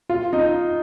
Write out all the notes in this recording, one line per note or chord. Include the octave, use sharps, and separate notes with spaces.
F4
D#4